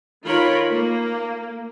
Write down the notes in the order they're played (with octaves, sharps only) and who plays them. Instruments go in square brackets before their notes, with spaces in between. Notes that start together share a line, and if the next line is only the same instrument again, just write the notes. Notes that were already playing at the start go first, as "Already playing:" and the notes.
[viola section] D#3 F4 A#4 C#5 B5
A#3